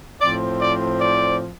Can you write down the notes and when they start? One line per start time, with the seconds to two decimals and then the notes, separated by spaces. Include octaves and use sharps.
0.20 A2 F3 C4 D5
0.60 D5
0.99 D5